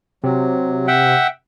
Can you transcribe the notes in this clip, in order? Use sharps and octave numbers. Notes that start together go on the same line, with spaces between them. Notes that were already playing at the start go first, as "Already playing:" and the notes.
C3 F#3
E5 F#5 G5